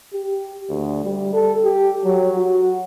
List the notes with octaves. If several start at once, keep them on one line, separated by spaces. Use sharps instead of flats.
G4
D2
G3
A4
G4
F#3
F#4